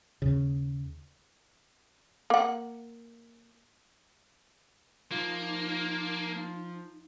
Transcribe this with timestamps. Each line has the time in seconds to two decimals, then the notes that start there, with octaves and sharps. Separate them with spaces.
0.22 D#2 C#3
2.30 A#3 F#5
5.12 F3 A#3 D#4